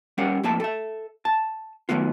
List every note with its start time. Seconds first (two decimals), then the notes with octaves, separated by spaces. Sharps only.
0.18 G3 C#4 G4 A#4 F5 F#5
0.43 F2 A2 A#3 E5 A5
0.60 A4 E5
1.25 A5
1.89 D#3 F3 F#3 A3 B3 F4